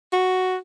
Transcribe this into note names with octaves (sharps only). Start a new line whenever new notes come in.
F#4